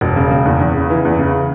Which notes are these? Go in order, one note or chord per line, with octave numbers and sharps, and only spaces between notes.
E1
C#3
C#3
E2
E2
C#3
E3
E2
C#3